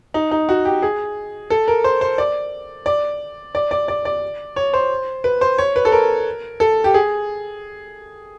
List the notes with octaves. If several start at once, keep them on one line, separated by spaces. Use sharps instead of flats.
D#4
D#4
F#4
G4
G#4
A4
A#4
C5
C5
D5
D5
D5
D5
D5
D5
C#5
C5
B4
C5
C#5
B4
A4
A#4
A4
G4
G#4